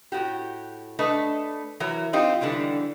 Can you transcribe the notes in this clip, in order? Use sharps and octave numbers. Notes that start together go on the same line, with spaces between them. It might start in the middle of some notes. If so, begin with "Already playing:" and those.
A2 F#4 G4
A3 D4 B4 D#5
E3 F#3 A#4
C4 D#4 F4 G4
D3 E3 G3 G#3